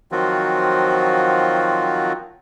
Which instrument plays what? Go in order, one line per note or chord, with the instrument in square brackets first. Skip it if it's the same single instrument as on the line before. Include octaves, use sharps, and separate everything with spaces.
[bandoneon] D#3 F3 F#3 C4 F4 F#4